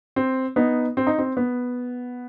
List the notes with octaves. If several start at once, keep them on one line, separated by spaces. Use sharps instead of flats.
C4
B3 D#4
C4
D#4
C4
B3